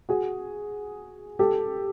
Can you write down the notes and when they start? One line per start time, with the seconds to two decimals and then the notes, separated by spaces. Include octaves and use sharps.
0.09 F#4 G#4
1.39 G4 A4